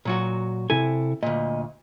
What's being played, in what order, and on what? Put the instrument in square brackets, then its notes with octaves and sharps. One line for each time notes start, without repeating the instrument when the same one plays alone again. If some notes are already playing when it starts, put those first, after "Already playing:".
[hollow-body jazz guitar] A#2 F#3 F#4
[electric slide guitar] C3 E4 A4 [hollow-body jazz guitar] G#5
[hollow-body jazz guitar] D2 A#2 [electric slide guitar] D#5